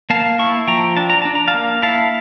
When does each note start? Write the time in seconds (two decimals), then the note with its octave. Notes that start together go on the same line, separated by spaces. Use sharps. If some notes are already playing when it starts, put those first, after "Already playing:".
0.10 A#3 F5 A5
0.39 E4 A5 C#6
0.67 F3 G5 A#5
0.97 D4 A5
1.10 A#5
1.22 D4 A5
1.35 A#5
1.48 F5 A5
1.54 A#3
1.82 E4 F5 A5